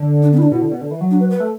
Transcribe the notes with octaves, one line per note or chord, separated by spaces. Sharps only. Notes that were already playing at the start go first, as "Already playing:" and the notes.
Already playing: D3
D4
B3
E4
D4
B2 E4
D3
B2
D3
E3
F#3
D4
B4
B4
A3